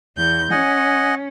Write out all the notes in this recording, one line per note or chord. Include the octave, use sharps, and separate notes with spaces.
E2 G6
C#4 D#5 F#5 G#5